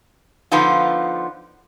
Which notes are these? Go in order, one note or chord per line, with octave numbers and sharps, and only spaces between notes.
D3 F3 B3 D#4 F4